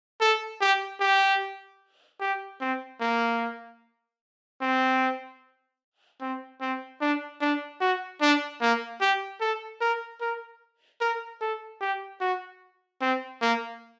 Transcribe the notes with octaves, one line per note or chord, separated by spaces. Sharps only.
A4
G4
G4
G4
C4
A#3
C4
C4
C4
D4
D4
F#4
D4
A#3
G4
A4
A#4
A#4
A#4
A4
G4
F#4
C4
A#3